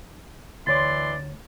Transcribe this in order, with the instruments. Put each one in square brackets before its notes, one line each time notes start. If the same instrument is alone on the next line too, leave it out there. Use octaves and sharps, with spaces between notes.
[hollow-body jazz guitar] D2 C#5 [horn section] E3 D5 C6 [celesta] A6